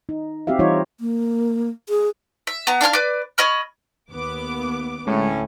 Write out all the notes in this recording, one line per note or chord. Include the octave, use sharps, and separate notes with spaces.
D#4
C4 F#4 G4 E5 F5
E3 G3 D#4 F4 C5 C#5
A#3
G#4
E5
B3 A#5
D4 F5 G#5 F6
B4 D5
C#5 D#5 B5 F6
D#2 B3 D6
D2 A2 G#3 C#4